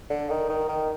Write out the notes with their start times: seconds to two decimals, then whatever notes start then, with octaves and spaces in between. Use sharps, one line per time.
0.10 D3
0.30 D#3
0.49 D#3
0.68 D#3